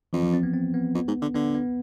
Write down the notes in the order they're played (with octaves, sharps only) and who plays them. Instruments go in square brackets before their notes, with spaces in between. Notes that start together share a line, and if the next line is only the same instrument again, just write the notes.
[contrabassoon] F2 [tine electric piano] E3
[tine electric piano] F3
C4
B3
C4
B3
[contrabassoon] F2
G#2
D3
[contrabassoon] D3 [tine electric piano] B3
[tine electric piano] B3